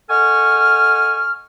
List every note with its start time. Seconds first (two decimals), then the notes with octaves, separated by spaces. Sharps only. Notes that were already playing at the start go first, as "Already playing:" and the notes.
0.10 A4 D#5 F#5 G#5 C#6 F6